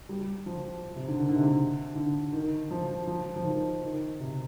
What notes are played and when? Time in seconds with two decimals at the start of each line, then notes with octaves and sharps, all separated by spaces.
0.09 G3
0.46 F3
0.96 C3
1.09 D3
1.21 D#3
1.29 D3
1.36 C3
1.44 D3
1.95 D3
2.33 D#3
2.71 F3
3.07 F3
3.36 F3
3.45 D#3
3.82 D#3
4.20 C3